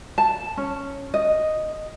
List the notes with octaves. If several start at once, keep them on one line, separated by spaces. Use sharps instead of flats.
A5
C#4
D#5